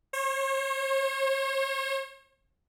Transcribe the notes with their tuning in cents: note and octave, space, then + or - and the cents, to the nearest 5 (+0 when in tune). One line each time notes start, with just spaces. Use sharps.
C#5 -45